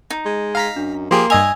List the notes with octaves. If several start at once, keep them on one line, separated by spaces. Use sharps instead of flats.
D#4
G#3
F5 A#5 B6
F#2 D4
F3 A#3 G4 G#4 C6
G2 D#5 G#5 E6 G#6 F7